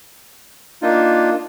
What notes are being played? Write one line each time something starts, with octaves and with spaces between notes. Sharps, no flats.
A#3 D4 D#4 F4